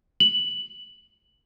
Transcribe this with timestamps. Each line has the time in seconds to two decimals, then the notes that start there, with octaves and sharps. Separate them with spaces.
0.20 F#7